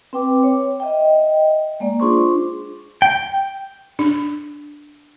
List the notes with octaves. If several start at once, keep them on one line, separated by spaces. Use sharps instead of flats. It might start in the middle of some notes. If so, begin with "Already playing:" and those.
C4 B4 G5 D6
C#5
D#5 E5 G5
G#3 A#3 D5
D4 F4 G#4 C5 C6 C#6
G5
D4